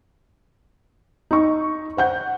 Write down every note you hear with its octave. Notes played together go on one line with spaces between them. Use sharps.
D#4 C#6
C5 F#5 G6